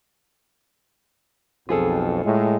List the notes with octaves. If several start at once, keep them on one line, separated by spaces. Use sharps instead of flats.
B1 F2 F4 G#4 A4
A2 G#3